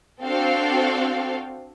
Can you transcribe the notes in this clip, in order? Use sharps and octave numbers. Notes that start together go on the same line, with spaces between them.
C4 D4 F#4 A4 F5 G5